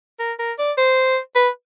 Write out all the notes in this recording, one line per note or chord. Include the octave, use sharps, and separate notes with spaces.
A#4
A#4
D5
C5
B4